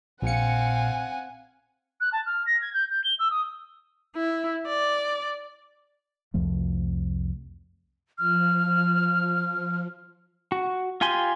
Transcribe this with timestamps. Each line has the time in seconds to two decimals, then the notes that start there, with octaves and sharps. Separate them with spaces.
0.22 A#1 A#2 C4 F5 F#5 G#5 C#7
2.00 F#6
2.12 A5
2.26 F6
2.46 A#6
2.61 G#6
2.73 G6
2.89 G6
3.04 G7
3.19 E6
3.30 D#6
4.16 E4
4.67 D5
6.34 C2 F2 F3 A3
8.18 F3 F6
10.52 F#4
11.01 F4 G4 G#5 C6